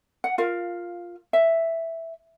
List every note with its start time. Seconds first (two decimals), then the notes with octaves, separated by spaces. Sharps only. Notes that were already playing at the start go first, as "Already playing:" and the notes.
0.24 F#5
0.38 F4 A#4 F5
1.33 E5